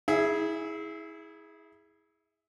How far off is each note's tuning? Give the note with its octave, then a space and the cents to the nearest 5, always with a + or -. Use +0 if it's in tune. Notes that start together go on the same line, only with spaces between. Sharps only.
E4 -30 G#4 +0 E5 +15